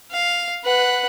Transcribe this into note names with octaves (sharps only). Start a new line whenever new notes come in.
F5
B4 F#5